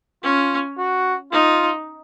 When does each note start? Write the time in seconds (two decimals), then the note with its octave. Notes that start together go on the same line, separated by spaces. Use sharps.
0.23 C#4 F4
0.78 F#4
1.32 D#4 F4